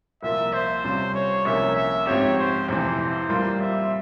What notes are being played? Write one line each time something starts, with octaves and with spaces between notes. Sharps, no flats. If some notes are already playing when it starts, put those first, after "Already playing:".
C2 A#2 F3 A#3 F4 E5
C5
C3 G3 C#4 F4
C#5
C2 C3 F3 A#3 C#4 E5
E5
G#2 F3 C4 G4 C#5
C5
F2 C3 E3 C5
A#2 G3 A#3 F4
E5